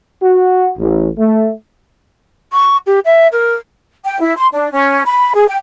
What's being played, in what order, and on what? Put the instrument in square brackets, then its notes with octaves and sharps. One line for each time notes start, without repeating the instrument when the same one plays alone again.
[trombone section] F#4
A1
A3
[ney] C#6
G4
E5
A#4
[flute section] G5
E4
C6
D4
C#4
B5
G#4
G5